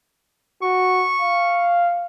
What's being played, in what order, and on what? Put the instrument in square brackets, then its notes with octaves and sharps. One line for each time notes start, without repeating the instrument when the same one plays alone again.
[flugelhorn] F#4 [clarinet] C#6
[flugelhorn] F5